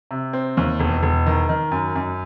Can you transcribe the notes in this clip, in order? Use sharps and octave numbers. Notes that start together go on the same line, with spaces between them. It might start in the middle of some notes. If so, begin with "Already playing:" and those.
C3
C4
D#2
E1
E1
D#3
D#3
F#2
F#2